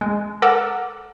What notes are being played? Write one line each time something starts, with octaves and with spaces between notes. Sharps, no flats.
G#3
A4 A#4 F#5 D6 E6